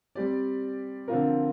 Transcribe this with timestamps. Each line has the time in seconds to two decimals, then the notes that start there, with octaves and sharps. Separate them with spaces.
0.15 G3 C4 G4 D5
1.08 D3 F3 C4 F4 A#4